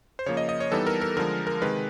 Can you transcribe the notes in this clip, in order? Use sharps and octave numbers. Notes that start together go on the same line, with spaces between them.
C5
C#3 F3 A#3 C#5
D#5
D#5
C#5
E3 G3 B3 D#4 A4
A#4
A#4
D3 F3 G#3 A#4
A#4
C3 D#3 G#3 B4